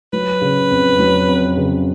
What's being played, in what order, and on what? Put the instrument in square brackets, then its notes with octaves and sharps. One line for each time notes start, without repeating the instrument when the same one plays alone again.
[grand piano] F#3 [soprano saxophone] B4
[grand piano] C#3
F2
F#3
F2
C#3